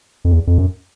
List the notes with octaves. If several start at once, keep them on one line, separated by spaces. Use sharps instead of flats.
F2
E2
F2
F#2